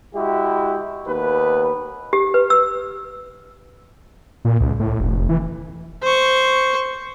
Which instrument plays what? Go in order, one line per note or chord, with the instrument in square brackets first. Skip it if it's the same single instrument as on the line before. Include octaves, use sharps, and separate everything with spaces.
[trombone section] G#3 E4 F#4 G4
D#2 B3 B4
[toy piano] G4
B4
E6
[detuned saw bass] A#2
C#2
A2
F1
E3
[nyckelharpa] C5 C#6